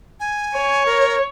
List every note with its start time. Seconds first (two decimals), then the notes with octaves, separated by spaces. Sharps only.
0.20 G#5
0.56 C#5
0.86 A#4